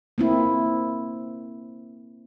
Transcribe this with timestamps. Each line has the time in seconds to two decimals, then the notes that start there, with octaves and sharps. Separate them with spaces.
0.18 A#3 C4 E4